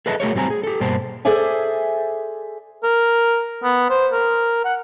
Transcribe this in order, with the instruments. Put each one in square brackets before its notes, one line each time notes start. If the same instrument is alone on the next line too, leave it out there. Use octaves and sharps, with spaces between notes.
[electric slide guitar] G#4 A4 B4 D#5 E5 A5
A3 F#4 G#4 A#4 C#5
A2 G3 C4 G#5 A#5
G#4
G4 A4
G2 B2 A#3 C5 A5
[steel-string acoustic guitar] G#4 A4 C5 D5 E5 G#5
[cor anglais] A#4
B3
C5
A#4
F#5